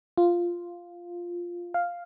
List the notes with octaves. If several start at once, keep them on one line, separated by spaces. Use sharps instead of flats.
F4
F5